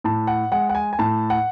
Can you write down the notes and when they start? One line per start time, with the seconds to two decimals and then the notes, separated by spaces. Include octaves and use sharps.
0.04 A2 A5
0.27 F#5
0.52 G#3 F#5
0.69 F#5
0.75 G#5
0.93 G#5
0.99 A2 A5
1.30 F#5